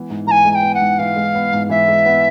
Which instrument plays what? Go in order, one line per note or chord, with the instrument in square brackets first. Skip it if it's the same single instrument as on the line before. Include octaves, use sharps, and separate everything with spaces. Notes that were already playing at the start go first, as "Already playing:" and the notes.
Already playing: [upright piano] E3 G#3 B3
G#2
[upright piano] E3 [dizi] G#5 A#5
[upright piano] G#3
[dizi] G#5
G5
[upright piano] B3
[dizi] F#5
[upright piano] G#2
[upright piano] E3 [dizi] F5
[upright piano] G#3
B3
G#2
[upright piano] E3 [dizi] E5
[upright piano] G#3
B3